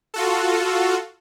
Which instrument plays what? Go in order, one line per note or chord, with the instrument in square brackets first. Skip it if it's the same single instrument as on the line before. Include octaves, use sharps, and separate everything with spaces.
[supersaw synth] F4 F#4 A4